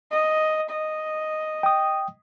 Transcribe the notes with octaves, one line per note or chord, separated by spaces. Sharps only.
D#5
D#5
G5 D#6